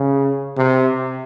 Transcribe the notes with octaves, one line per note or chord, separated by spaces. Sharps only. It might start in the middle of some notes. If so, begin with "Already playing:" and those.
Already playing: C#3
C3